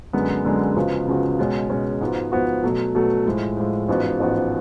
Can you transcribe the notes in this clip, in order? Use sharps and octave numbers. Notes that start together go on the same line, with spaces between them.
F#2 D3 G#3 B3
F#2 D3 G#3 B3
C#2 C#3 F3 B3 F#4
C#2 C#3 F3 B3 F#4
B2 G#3 C#4
B2 G#3 C#4
G#2 F3 B3 F#4
G#2 F3 B3 F#4
B2 F#3 A3
B2 F#3 A3
A2 F3 G#3
A2 F3 G#3
A1 G#2 F3 B3 F#4
A1 G#2 F3 B3 F#4